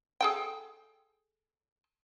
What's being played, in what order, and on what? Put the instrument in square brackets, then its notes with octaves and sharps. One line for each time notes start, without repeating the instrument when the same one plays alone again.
[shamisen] G#4 A4 G5